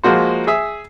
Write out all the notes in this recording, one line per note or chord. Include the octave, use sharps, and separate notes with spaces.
F3 G#3 A#3 F#4 C5
G#4 E5